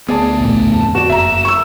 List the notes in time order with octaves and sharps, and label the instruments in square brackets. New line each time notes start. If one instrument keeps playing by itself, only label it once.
[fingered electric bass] D2 B3 [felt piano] G#4 D5 A5
[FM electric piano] A#1 E2 A2
[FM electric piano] F2 [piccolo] A5
[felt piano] F#4 D5 [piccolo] E7
[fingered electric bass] F#1 [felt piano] E5 A#5
[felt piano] C#6 E6